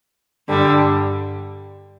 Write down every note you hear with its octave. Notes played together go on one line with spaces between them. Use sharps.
G2 D3 G3